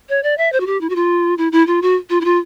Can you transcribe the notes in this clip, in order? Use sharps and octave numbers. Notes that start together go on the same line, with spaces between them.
C#5
D5
E5
C5
F#4
G4
E4
F#4
F4
E4
E4
F4
F#4
F4
E4
F4